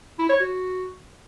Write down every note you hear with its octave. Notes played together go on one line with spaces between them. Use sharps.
E4
C#5
F#4